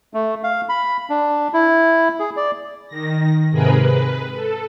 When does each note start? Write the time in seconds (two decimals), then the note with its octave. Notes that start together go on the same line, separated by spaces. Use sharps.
0.14 A3
0.43 F5
0.69 B5
1.10 D4
1.54 E4
2.19 G#4
2.37 D5
2.88 D#3 A#6
3.51 G#2 C3 G#4 A#4 B4 B5
3.80 B4
4.36 A4